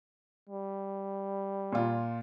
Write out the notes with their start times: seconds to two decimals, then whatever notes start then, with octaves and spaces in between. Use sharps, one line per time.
0.49 G3
1.72 A#2 F4